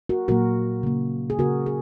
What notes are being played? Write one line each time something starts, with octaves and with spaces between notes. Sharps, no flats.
F#4 A#4
A#2 F#3 A#3 F#4 A#4
C#3 A#3
G#4
C#3 A#3 F#4 A#4
G#4